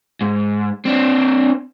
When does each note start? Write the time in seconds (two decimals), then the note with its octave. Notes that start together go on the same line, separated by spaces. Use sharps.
0.21 G#2
0.85 C4 D4